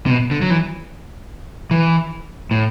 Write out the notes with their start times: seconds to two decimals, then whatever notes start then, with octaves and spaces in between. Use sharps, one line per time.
0.06 C3
0.10 B2
0.31 D3
0.42 F#3
0.50 E3
1.71 E3
2.51 A2